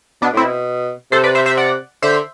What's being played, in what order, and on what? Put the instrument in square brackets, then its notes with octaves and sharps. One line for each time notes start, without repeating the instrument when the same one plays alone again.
[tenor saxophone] B2 [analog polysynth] B3 D4
[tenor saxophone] A2 [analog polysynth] C4 E4
[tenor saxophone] B2
[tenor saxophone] C3 [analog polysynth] A4 C5
[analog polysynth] B4 D5
C5 E5
C5 E5
D5 F#5
[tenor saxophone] D3 [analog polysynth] C5 E5